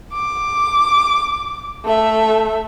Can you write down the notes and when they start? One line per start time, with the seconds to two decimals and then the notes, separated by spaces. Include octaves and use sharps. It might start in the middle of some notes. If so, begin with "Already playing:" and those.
0.12 D6
1.85 A3 E5